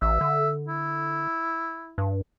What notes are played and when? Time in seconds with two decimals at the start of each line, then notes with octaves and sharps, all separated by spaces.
0.02 A1 E5
0.21 D3
0.68 E4
1.98 G2